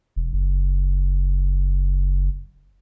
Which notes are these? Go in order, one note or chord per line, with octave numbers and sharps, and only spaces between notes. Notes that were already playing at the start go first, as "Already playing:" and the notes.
E1
F#1